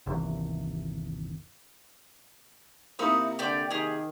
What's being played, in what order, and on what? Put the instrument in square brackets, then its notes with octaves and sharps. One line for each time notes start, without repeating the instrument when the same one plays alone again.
[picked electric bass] G1 D#2 C3 E3
[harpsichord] C3 A#3 [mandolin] D#4 B5 E6 [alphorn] E4
[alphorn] D3 [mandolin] G4 D5 G5
[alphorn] D#3 [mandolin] G4 G#4